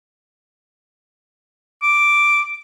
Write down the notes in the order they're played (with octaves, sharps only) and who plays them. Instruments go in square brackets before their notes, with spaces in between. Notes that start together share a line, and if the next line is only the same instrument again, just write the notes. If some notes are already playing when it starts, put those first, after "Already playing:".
[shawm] D6